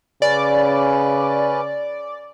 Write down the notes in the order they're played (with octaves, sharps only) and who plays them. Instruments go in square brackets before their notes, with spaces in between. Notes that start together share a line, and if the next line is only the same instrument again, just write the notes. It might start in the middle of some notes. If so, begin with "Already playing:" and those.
[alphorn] C#3 [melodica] C#4 B4 [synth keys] D5